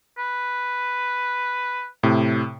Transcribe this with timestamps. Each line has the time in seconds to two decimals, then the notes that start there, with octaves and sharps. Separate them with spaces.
0.18 B4
2.03 A2 C3